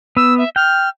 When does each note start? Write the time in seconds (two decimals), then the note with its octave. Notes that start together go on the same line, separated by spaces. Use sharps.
0.17 B3 E6
0.38 E5
0.56 G5 F6